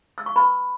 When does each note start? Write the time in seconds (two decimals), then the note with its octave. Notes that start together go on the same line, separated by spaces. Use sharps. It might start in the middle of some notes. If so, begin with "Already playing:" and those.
0.18 E6
0.26 C#6
0.36 B4 B5